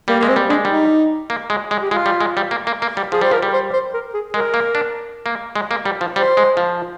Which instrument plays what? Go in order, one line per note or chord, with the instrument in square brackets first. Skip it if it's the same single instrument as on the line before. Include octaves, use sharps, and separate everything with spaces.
[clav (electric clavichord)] G3 [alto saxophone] A#3
[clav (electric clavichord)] G#3 [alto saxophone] A#3
[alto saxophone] C4
[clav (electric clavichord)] G3
[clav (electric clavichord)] G#3 [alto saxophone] D4
[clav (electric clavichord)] G3 [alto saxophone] D#4
[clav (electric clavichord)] A#3
G#3
G#3
[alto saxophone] G4
[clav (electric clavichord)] G#3 [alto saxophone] F4
[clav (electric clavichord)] G3
G#3
G3
A#3
A#3
A#3
G3
[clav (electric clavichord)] F3 [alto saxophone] G#4
[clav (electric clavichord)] G3 [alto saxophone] C5
[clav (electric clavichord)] F3 [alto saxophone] A#4
[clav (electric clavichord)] G3
[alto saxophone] C5
C5
A#4
G#4
[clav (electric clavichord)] G#3 [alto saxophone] A#4
[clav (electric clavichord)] A#3
D4
A#3
G#3
A#3
G3
F3
[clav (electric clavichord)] G3 [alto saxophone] C5
[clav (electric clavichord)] G#3
F3